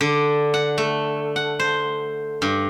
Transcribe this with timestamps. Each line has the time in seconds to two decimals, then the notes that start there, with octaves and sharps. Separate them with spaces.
0.01 D3
0.54 F#5
0.78 A3
1.36 F#5
1.59 C5
2.42 G2